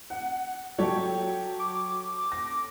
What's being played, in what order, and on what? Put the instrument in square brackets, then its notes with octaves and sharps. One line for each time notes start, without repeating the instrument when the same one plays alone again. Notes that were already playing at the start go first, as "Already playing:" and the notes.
[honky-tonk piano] F#5
[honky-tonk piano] F#3 G5 [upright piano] G4 A4 C#5
[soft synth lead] D6
[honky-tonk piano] A#6